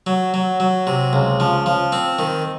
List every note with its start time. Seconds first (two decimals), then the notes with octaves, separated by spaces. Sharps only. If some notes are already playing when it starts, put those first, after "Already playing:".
0.07 F#3
0.34 F#3
0.60 F#3
0.87 C3
1.13 C#2
1.40 F3
1.66 F3
1.92 C4
2.19 D#3